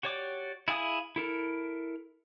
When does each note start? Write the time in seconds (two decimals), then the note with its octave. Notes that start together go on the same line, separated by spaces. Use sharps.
0.03 F#4 G4 C#5 D5 D6
0.68 E4 G#4 F5 G#5 D#6
1.16 E4 A4 A#4